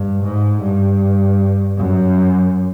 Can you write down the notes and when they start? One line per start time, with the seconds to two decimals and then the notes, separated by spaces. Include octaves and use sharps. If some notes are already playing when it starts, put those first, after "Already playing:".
Already playing: G2
0.23 G#2
0.63 G2
1.77 F#2